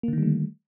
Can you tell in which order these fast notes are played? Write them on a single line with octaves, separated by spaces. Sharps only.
A#3 D3 D#3 G3 A3